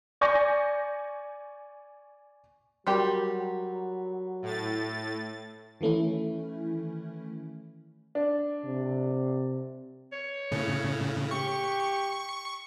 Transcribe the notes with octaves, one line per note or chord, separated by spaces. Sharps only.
D5 G#5 C#6 G6 A#6
F#3 G3 F#4 G4 A#4 C6
A2 A6
D#3 E3 A3 C#4 E4
D4
C3
C#5
A2 C#3
G4 C#6